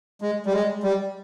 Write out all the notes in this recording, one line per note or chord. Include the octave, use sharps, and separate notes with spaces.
G#3
G3
G#3
G3